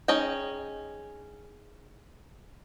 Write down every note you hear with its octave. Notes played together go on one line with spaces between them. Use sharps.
C#4 D#4 G#4 G5